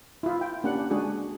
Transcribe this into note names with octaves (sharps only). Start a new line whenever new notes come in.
E4 F4
G5
A#3 C#4 D4 G4 F#5
G#3 D4 F#4 G#4